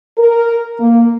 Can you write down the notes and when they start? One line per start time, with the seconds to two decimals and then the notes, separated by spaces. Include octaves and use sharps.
0.18 A#4
0.80 A#3